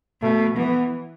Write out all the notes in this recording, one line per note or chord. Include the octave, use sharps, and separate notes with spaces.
B2 A3
E3 B3